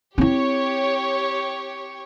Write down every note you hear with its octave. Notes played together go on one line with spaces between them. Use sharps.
C4 E4 G4 C#5